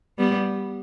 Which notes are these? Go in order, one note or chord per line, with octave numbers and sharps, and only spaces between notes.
G3 B3